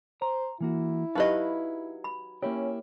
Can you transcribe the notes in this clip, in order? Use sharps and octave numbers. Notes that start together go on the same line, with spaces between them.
C5 A#5
E3 A#3 E4 F#4
F#3 D#4 G4 B4 D#5 F5
B5
A#3 C#4 E4 G4 C#5